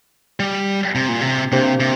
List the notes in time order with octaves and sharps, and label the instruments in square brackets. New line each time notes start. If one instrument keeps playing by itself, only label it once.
[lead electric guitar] G3
C3
A#2
C3
[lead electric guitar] C3 [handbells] A#3 D4 G4 C5 G5
[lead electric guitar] C3